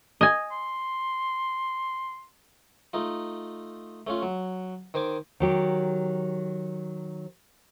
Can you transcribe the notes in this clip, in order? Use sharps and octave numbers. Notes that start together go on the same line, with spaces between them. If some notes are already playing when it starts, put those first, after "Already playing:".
D#5 G#5
C6
A3 D#4 F4
A3 C#4 F4
F#3
D#3 C5 G#5 D6
D#3 F#3 G4